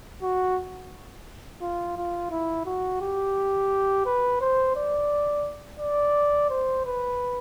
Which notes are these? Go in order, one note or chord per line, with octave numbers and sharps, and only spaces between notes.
F#4
F4
F4
E4
F#4
G4
B4
C5
D5
D5
C5
B4